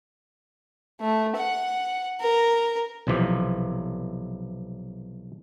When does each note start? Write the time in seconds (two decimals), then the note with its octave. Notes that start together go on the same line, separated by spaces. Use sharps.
1.01 A3
1.37 F#5
2.21 A#4
3.07 B1 C3 E3 F3